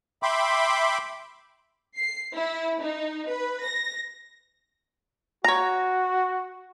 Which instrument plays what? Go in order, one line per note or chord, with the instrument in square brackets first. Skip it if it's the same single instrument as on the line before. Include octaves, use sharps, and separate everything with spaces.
[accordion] E5 G5 B5 C6 D6
[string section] C7
E4
D#4
B4
A#6
[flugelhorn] F#4 [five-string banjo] C#5 A#5